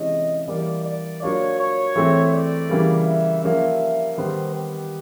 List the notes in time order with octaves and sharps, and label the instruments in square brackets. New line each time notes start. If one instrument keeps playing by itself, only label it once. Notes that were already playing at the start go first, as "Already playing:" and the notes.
Already playing: [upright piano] C3 E3 G#3 C#4 E4 [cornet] D#5
[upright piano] E3 G3 A#3 [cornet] D5
[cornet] D5
[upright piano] F#3 A#3 D4 F4 [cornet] C#5
[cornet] C#5
[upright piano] E3 A3 C4
[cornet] D5
[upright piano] C#3 E3 G3 A#3
[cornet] E5
[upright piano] F3 A#3 C#4 [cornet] E5
[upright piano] D#3 G3 B3 [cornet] C5
[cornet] G4